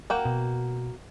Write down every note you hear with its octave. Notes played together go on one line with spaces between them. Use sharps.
A#3 F#4 G5
B2